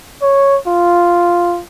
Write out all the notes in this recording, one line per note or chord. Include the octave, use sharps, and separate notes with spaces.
C#5
F4